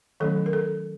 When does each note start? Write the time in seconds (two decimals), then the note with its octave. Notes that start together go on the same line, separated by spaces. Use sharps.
0.20 D#3 F#3 A3 C#4 A4
0.46 A#4
0.53 A4